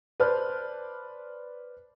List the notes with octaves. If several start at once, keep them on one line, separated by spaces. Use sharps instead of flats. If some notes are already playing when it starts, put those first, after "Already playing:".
B4 C5 D5 A5 F6 F#6